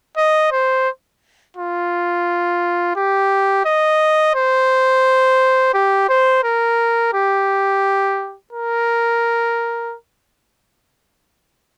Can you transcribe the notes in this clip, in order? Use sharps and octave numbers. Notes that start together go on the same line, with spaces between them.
D#5
C5
F4
G4
D#5
C5
G4
C5
A#4
G4
A#4